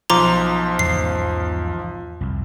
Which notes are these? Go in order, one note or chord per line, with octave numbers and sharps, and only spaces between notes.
B1 F3 A#5 C6 D6
E2 G#2 C#3 C7
C2 F2